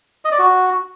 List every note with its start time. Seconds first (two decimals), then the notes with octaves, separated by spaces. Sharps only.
0.25 D#5
0.32 D5
0.39 F#4